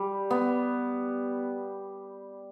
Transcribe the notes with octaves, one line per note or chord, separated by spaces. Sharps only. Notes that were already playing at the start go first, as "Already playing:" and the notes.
Already playing: G3
B3